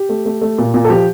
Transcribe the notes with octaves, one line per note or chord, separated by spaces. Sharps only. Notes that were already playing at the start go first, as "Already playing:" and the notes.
Already playing: G4
A3
A3
A3
A#2
A#2
A4
F3 G4